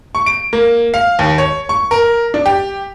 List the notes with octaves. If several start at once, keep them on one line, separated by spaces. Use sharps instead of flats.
C#6
D7
A#3
F5
D#2
C#5
C#6
A#4
D4
G4